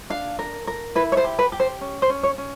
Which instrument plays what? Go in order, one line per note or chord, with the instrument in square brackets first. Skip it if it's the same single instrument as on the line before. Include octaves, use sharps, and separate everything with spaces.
[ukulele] D4 F5
A#4
A#4
E4 B4
C#5
C5
G4
B4
G4
C5
C#4
C5
C#4
C#5
C#4